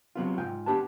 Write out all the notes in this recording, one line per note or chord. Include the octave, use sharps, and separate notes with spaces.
C3 F#3 B3 F4
G#2 F4 G5
B3 D4 G4 B4 A5